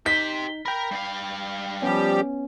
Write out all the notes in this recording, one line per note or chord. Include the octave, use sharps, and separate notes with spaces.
D#4 G4 C5 B6
A#4 G5 A#5 B5
G2 F5
F3 G3 B3 C#4 G4